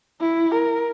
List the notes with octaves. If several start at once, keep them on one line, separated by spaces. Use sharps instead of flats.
E4
A#4